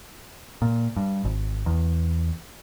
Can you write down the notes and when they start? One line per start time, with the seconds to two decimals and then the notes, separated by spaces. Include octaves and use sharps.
0.62 A#2
0.96 G2
1.25 G#1
1.66 E2